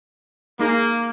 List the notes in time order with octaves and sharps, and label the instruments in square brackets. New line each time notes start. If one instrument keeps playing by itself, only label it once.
[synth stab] G#3 D#4 G#4 [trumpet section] A#3